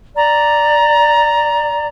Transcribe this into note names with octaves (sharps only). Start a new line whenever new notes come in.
D5 A#5